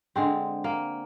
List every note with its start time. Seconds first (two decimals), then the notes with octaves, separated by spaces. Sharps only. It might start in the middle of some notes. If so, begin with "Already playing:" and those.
0.16 D3 G#3 C4
0.64 A#3